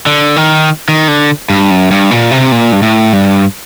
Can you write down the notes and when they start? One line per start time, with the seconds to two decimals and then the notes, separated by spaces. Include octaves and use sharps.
0.06 D3
0.36 D#3
0.88 D#3
1.08 D3
1.50 G2
1.71 F#2
1.91 G2
2.11 A#2
2.31 C3
2.52 A#2
2.72 G2
2.82 A2
3.13 G2